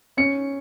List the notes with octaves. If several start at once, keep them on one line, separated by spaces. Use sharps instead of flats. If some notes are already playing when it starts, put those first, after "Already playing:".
C#4 C#7